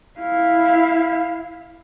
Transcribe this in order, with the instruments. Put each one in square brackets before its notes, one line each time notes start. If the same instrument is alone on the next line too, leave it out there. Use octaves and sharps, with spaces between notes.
[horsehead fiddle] E4 F5